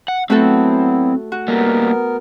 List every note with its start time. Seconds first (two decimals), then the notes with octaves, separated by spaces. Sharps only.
0.08 F#5
0.30 F#3 A3 B3 C4 E4 F#4 A4
1.32 F#4
1.48 G3 A#3 B3 A#4